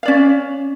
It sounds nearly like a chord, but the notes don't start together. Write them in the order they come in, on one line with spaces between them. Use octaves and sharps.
F5 D5 C#4